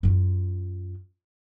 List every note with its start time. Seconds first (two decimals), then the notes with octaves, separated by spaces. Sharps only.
0.03 F#2 F4